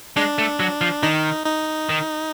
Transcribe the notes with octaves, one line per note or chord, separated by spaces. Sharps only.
G#3 D4
A3
F#3
F3
D#3 D#4
D#4
D#3